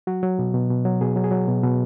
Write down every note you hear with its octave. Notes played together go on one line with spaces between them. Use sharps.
F#3 F#4
F#3
B2
B2
B2
F#3
B2 G#4
F#3
G#4
F#3
B2
B2